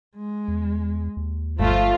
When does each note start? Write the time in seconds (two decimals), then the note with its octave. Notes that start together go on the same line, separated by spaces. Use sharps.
0.16 G#3
0.48 E2
1.17 D#2
1.60 G1 F3 A3 F4